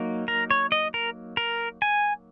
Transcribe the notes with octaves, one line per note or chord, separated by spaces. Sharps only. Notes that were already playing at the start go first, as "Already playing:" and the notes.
Already playing: F#3 A#3 D#4
A#4
C#5
D#5
A#4
A#4
G#5